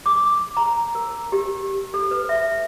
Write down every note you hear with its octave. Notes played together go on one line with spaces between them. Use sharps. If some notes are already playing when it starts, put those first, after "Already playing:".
D6
A#5
A#4
G4
A4
B4
E5